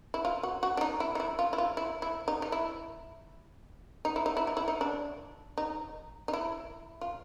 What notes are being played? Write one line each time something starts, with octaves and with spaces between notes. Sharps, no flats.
E4
F4
F#4
F#4
D4
D#4
E4
D#4
E4
F4
E4
F4
E4
E4
D#4
D#4
E4
D#4
E4
D#4
E4
D#4
E4
D#4
D4
D#4
D#4
E4
F4